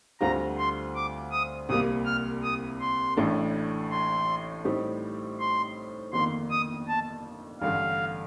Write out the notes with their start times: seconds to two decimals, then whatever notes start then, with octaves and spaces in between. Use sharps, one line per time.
0.20 D2 D3 G3 C4 F4 A#5
0.58 C6
0.95 D6
1.31 D#6
1.69 C2 C3 G3 A#3 D#6
2.06 F6
2.43 D#6
2.80 C6
3.17 A1 A2 A3 D4
3.91 C6
4.65 A2 G3 C4 D#4 G4
5.40 C6
6.13 G1 F2 D#3 A#3 C6
6.50 D#6
6.88 A5
7.61 A1 G2 D3 F5